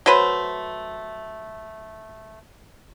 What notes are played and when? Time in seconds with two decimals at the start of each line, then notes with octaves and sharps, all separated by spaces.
0.06 F#3 A3 B4 C5